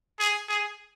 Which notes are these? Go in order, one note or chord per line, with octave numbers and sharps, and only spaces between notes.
G#4
G#4